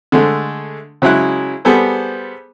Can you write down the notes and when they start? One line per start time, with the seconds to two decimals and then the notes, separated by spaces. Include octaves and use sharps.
0.12 D3 G#3 A3
1.02 C#3 F#3 G#3 E4 F#6
1.65 G3 B3 G#4 A4 C5